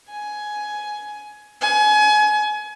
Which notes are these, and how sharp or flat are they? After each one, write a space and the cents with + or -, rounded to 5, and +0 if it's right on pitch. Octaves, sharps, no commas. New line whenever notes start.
G#5 +15
G#5 +30